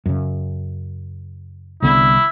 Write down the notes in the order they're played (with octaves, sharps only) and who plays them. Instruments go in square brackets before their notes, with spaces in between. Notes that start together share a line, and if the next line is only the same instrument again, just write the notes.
[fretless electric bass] F#2 C#3
[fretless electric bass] C2 D3 B3 [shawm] E4